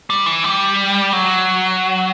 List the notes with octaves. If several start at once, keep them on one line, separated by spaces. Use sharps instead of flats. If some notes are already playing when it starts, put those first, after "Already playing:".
G3
E3
G3
F#3